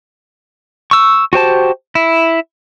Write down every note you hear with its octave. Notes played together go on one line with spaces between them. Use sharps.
C#6 E6
F#4 G4 C5 A5
E4